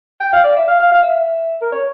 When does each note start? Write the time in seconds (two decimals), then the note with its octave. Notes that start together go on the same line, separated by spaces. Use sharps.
0.20 G5
0.32 F5
0.43 D5
0.56 E5
0.68 F5
0.79 F5
0.91 F5
1.02 E5
1.61 A#4
1.72 C#5